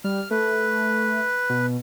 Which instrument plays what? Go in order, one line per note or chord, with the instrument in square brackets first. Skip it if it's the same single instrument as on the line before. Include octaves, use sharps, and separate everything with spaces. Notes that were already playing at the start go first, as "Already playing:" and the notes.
[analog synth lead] G3 [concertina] F6
[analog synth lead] A3 [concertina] B4
[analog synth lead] B2